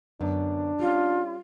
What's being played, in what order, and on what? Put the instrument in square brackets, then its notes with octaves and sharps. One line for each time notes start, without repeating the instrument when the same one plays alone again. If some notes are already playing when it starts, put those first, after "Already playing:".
[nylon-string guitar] F#2 D3 B3 [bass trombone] D4
[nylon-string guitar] G3 C#4 [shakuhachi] F4